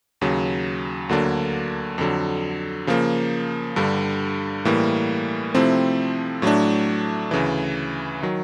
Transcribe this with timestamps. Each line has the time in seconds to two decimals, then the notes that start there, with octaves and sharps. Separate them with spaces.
0.21 D#2 C#3 F#3
1.09 D2 D3 F#3 A#3 D4
1.98 F2 D3 F#3
2.87 C#3 F3 A#3
3.76 G2 D3 G3
4.65 A2 E3 G3 A#3
5.54 C3 F3 A3 C4 E4
6.42 A2 F#3 A3 D4
7.31 D2 C#3 E3
8.22 D#3 F#3